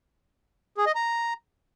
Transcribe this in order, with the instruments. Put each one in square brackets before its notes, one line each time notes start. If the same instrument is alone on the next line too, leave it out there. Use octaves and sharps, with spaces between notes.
[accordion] G#4
D#5
A#5